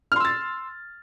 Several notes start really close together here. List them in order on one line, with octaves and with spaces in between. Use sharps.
F6 C6 E6 A6